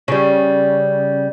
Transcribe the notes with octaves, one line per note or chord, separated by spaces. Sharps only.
C#3 G3